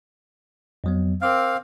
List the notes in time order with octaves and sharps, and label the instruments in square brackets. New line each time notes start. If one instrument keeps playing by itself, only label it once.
[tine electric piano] F2 F#3 B3
[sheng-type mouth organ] C4 F5 [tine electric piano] A#4 D6 F6